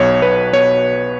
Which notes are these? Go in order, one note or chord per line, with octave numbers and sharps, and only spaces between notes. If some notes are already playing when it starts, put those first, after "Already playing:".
Already playing: B1 B2 C#5
B1 B4
B2 C#5